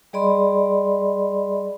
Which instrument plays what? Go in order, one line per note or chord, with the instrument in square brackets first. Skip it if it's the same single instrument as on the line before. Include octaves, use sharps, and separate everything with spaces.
[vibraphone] G3 G#4 D5 D#5 B5 C6